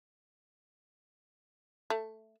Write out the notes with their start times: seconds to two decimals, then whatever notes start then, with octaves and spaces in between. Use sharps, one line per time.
1.90 A3